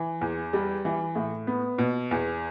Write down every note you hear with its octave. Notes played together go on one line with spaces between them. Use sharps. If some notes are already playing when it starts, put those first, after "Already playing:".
Already playing: E3
E2
G3
E3
A2
B3
B2
E2